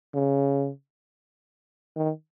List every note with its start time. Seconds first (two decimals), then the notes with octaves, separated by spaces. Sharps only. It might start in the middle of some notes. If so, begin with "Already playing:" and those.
0.14 C#3
1.96 D#3